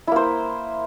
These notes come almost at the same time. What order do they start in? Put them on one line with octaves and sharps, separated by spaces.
E4 A#3 C5